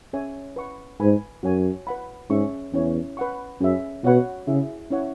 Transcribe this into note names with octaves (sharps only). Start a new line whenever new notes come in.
C#4 G#4 C#5 E5 G#5
B4 F#5 C#6
G#2 B4 G#5 B5
F#2 F#4 C#5 G#5
B4 F#5 B5
G#2 C#4 G#4 E5 C#6
E2 C#4 E4 C#5
B4 F#5 C#6
F#2 C#4 G#4 E5
B2 F#4 C#5 F#5 B5
C#3 E4 G#4 E5
C#4 E4 C#5 F#5